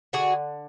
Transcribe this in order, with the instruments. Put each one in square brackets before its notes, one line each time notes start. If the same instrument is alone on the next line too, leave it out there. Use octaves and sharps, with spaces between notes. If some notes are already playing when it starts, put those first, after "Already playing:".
[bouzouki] D3 F#4 G#4